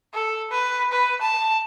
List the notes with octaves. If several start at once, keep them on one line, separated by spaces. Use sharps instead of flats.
A4
B4
B4
A5